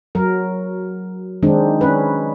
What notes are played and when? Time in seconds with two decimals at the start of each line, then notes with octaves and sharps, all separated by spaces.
0.15 F#3 A#4
1.42 D#3 G#3 C4 D4 D#4
1.81 C#4 B4